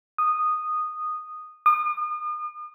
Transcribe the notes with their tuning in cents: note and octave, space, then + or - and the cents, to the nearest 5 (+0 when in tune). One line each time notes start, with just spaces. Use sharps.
D#6 -10
D#6 -40